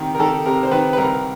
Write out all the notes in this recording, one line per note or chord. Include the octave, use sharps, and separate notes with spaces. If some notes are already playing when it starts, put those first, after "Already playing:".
Already playing: C3 D#3 G4
A#4
D#3 A4
C3 A#4
C5
D#3 B4
B4
C2 A#4